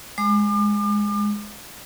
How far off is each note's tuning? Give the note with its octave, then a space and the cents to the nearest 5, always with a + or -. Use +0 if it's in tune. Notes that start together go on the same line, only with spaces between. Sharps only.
G#3 +0 D6 +40